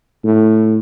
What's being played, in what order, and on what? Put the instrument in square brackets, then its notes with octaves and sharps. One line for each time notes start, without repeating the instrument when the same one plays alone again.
[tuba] A2